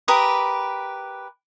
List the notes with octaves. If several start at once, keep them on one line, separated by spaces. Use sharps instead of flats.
G4 A#4 B4 D#6